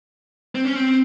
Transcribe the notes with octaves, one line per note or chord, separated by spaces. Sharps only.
C4
C#4
C4